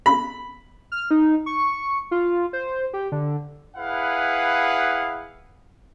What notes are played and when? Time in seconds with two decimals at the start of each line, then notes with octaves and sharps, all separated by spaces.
0.06 B5
0.92 F6
1.11 D#4
1.46 C#6
2.11 F4
2.53 C5
2.93 G4
3.12 D3
3.77 E4 G#4 B4 F5 F#5